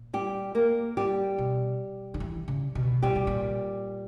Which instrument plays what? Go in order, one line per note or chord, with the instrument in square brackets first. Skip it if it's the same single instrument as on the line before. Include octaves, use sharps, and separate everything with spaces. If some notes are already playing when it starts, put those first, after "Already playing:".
Already playing: [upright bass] A#2
[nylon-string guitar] G3 G4
A#3 A#4
G3 G4
[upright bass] B2
D3
E3
C#3
B2
[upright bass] A#2 [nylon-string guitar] G3 G4
[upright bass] B2
A#2